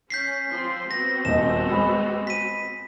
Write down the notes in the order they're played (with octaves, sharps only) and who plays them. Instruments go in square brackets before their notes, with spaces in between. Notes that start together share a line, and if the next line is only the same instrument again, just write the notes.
[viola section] C#4 [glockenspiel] G6 B6 C7
[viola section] F3 C4 C6
[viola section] B3 C4 F#4 [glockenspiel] A#6
[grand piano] D#1 D#5 [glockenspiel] E7
[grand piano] G#3 B5
[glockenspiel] B6 D#7